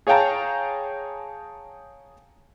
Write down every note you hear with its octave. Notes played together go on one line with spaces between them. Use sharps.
G#4 C#5 F5 G5 A5 A#5